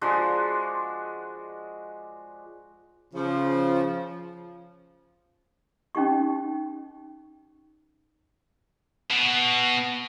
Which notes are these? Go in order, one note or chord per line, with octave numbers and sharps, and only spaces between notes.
F3 G#3 D4 F#4
C#3 F3
C#4 D#4 G4 C#6
B2